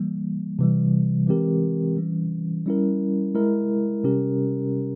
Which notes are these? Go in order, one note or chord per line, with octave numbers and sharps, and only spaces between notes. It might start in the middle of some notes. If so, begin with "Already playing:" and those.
Already playing: E3 G3 A#3
C3 E3 G3
E3 G#3 C4 G4 A#4
E3 G3 C#4
G3 C#4 E4 A#4
G#3 E4 A#4
C3 G3 C#4 G4 A#4